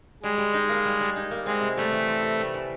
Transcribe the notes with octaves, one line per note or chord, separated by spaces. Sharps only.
G3 G#3
G3
D#4
A#3
G3
G3
D#4
A#3
G#3 C4
C3
G3 A3
E3
C4
C3
G3
E3